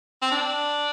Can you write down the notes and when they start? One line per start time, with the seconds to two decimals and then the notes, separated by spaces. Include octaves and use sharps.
0.22 C4
0.31 D4